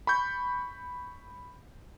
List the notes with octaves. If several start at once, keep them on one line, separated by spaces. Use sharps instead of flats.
B5 C#6 G6